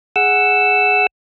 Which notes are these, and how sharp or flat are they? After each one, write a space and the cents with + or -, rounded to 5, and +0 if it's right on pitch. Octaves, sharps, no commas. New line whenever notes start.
G#4 +0 F#5 +0 E6 +0